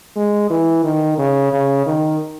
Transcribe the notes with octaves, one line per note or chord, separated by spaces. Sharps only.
G#3
E3
D#3
C#3
C#3
D#3